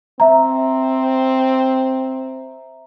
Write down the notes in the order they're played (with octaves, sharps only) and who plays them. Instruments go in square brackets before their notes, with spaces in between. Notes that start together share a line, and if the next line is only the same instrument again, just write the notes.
[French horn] C4 [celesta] E5 A#5